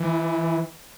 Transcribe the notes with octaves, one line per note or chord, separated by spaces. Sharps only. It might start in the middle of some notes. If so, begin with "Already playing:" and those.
Already playing: E3